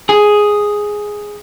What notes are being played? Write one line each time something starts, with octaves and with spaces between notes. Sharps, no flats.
G#4